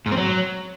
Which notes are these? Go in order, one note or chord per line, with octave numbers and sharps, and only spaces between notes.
G#2
C4
F#3